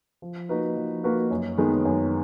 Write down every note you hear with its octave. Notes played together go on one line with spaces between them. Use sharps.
F3
A#3 D#4 F#4 B4
F3
A#3 D#4 F#4 B4
F#2
D#3 G#3 B3
F#2